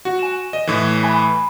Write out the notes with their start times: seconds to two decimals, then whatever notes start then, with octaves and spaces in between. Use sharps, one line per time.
0.05 F#4
0.19 G#5 E7
0.53 D#5
0.67 A2 E3
1.03 G#5 B5